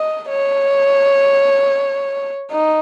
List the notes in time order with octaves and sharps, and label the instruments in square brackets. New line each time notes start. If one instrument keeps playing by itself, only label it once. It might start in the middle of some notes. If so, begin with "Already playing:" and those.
Already playing: [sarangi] D#5
C#5
D#4